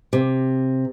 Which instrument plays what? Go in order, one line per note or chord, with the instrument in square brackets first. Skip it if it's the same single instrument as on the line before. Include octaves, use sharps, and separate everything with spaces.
[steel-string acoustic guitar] C3